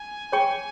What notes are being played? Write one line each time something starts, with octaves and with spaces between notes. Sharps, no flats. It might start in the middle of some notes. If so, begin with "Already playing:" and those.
Already playing: G#5
G#4 C#5 G5 C#6